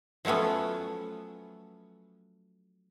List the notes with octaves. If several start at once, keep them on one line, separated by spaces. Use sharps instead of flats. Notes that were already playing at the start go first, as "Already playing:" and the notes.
F3 F#3 A3 B3 C#4